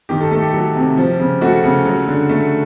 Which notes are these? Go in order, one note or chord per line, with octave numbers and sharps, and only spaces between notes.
D#3 G4
A4
A3 A4
G4
F#3
C3
F3
C#3
A3 F#4
C#3
F#3
D3
A3